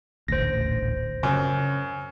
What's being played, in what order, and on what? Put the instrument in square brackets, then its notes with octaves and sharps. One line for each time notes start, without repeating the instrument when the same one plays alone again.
[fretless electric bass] D#1 A1 D2 [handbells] C5 A#6
[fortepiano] F#2 [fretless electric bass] C#3 C#4